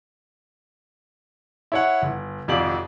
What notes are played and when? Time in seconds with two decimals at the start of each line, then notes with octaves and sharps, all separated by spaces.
1.72 E4 C#5 F#5
2.02 G1
2.48 G#1 F2 C3 D5 F5 F#7